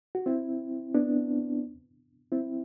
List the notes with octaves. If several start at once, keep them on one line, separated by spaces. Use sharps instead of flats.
F#4
C4 E4
B3 D4
C4 E4